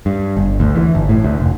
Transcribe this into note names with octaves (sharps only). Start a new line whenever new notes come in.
G2
G1
D2
E3
G1
A2
D2
F1